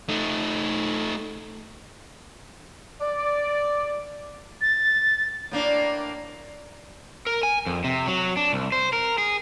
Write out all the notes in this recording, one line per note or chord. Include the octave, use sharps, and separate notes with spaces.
A3 D#4
D5
A6
A2 A#3 D4
A#4
G#5
F2
C3
F#3
D4
C2
C5
A#4
G#4